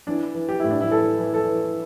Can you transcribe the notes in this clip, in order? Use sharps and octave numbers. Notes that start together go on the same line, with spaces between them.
E3 D4
E3
G4
A2 E4
D4
E4
E3 A4
E3
A4
E3